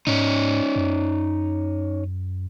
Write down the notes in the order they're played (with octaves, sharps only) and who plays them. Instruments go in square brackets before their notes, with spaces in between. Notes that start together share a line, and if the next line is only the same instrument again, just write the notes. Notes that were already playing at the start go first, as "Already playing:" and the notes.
[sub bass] G#2 [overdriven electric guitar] C#4 D#4
[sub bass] F#2